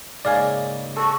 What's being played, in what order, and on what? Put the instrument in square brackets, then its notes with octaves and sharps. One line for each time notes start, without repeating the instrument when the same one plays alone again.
[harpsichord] G#2 C#3 A#3 [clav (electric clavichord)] D5 F5 G#5
[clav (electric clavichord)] A4 [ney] C#6